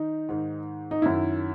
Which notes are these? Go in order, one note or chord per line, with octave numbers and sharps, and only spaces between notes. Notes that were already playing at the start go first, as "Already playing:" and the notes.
Already playing: D#3 D#4
G#2 D#3
D#4
F#2 D#3 E4